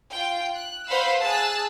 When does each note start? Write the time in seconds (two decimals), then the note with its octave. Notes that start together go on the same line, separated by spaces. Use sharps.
0.11 F4 G5
0.54 F#6
0.87 B4 C5 F5 F#5 B5 E6
1.20 G#4 A5 E6 F#6 A6